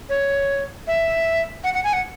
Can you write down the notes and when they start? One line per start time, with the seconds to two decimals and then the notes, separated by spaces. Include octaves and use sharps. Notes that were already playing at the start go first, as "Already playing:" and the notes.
0.09 C#5
0.87 E5
1.64 F#5
1.74 F#5
1.84 G#5
1.93 F#5